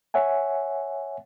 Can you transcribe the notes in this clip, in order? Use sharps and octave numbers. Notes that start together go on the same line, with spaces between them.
C#5 E5 F#5 G#5